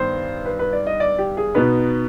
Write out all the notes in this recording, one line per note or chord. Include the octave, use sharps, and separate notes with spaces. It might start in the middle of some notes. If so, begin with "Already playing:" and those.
Already playing: G2 D#3 B3 D#4 C5
B4
B4
D5
D#5
D5
G4
G#4
B2 B3 D#4 B4